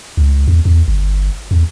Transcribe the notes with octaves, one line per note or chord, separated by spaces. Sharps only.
C#2
E2
E2
G1
E2